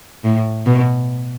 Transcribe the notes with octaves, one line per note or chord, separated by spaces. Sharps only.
A2
B2